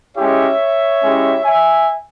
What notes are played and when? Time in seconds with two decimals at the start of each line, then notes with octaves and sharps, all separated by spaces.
0.16 G#3 C#4 E4 G4 C#5 E5
1.03 G#3 C#4 E4 G4
1.45 E5 G#5